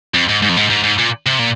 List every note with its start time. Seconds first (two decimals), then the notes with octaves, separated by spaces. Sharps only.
0.14 F2
0.29 G#2
0.42 G#2
0.49 F2
0.57 G#2
0.70 G#2
0.84 G#2
0.99 A#2
1.26 C3
1.39 A#2